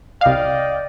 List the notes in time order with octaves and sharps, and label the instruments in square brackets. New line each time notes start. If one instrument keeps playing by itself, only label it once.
[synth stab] C2 F5 [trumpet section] D5 D#5 G5